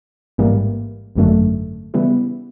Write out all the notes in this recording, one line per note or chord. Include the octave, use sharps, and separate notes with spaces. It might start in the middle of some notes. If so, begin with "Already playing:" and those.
A1 G#2 E3 G3 A#3
G#1 F#2 D3 F#3 A3
C#3 E3 G3 B3 E4